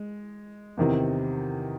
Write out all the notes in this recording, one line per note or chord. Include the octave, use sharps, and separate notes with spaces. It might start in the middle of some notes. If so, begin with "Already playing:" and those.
Already playing: G#3
E2 C3 D#3